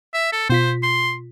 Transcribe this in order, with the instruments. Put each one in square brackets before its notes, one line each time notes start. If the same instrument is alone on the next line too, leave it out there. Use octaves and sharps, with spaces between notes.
[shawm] E5
A4
[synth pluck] B2 F4 B6 [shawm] C5
[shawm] C6